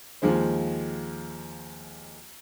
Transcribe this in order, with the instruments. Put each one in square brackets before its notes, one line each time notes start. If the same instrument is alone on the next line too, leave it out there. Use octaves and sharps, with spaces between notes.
[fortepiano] D#2 F3 G#3 C5